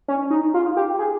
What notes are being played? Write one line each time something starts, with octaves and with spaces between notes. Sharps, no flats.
C#4
D#4
F4
G4
G#4